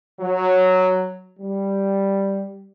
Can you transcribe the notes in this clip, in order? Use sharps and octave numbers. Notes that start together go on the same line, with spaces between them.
F#3
G3